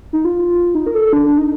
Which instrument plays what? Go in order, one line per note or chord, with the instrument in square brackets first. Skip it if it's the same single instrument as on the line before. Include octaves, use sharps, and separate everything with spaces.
[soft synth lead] D#4
F4
D#4
A#4
A4
D4
D4
D#4